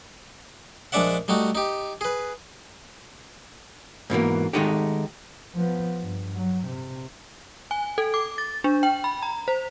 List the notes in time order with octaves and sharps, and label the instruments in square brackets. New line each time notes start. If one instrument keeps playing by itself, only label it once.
[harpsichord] A#1 G#3 D4 D5 E5 F#5
G3 A3 D#4 F#4
D#4 G4
G#4 B4
[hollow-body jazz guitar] G#2 B2 E3 A#3
D#3 G#3 A3 D#4 F#4 G4
[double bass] F3 B3
G2
F#3
C3
[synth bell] G#5
A4
D6
A6
D4
G5
B5
A#5
C5